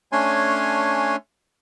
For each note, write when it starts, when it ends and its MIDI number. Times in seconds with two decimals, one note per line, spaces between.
0.12 1.16 57
0.12 1.16 61
0.12 1.16 62
0.12 1.16 73
0.12 1.16 80
0.12 1.16 84